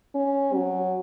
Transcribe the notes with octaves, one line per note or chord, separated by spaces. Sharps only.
C#4
F#3